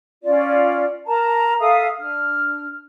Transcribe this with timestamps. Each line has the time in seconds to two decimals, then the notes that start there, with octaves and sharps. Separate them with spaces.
0.23 C#4 F4 D5
1.07 A#4 A5 A#5
1.60 A4 E5 F5 D#6
1.99 D4 F6